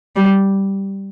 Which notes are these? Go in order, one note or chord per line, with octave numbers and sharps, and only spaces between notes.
G3